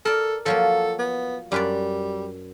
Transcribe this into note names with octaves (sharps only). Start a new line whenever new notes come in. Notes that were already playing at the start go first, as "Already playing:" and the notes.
A4 A#4 D5
F3 F#3 A#3 A4
B3
F#2 G3 B4 D5